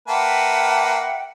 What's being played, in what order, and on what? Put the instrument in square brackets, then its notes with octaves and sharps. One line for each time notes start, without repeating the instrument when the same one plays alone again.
[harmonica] A#3 B4 A5 [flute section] E5 F#5 G5